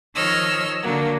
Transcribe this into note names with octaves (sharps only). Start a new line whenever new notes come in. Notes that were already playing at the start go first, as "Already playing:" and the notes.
D#3 F3 C#5 D#5 E6 F6
D3 F#3 A#3